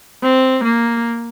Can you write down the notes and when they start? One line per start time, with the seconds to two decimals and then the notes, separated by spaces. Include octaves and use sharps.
0.23 C4
0.64 A#3